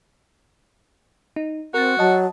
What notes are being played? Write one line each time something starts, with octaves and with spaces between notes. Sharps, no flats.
D#4
C4 F#4 A#4 A6
F#3 D#5 A5